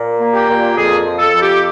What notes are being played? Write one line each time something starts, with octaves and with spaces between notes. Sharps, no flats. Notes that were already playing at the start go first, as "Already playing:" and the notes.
Already playing: A#2
A#3
G4
A#2
F2 G#4
F3
A4
F2
G4